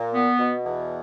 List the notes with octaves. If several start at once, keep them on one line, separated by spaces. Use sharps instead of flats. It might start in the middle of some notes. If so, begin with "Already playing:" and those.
Already playing: A#2
B3
B2
E2